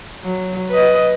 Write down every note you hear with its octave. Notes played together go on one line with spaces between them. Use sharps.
F#3
B4 D#5